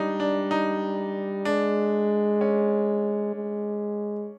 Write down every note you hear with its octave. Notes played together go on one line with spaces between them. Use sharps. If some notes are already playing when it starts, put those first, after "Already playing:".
Already playing: G3 D4 D#4
D4
D#4
G#3 D4
C#4
G#3